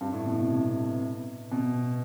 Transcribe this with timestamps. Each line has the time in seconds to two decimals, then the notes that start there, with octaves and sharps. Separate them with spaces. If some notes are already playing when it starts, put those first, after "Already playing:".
0.01 G2
0.13 A2
0.26 B2
0.38 C3
0.50 C3
1.52 B2